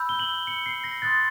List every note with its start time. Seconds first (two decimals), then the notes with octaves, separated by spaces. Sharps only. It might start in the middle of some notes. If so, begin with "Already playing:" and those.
Already playing: B5 E6 G6
0.09 G7
0.19 F#7
0.47 C#7
0.66 C7
0.84 A#6
1.02 C6 D#6 F#6 A6